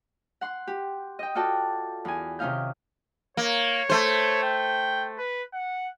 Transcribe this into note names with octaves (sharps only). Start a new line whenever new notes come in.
F#5 C6
G4
D#5 G5
F4 F#4 A4 D5 G5
E2 G#5
C3 D#3 C#4 D#4 F5 G6
A#3 C#5
A3 C5
G5
B4
F#5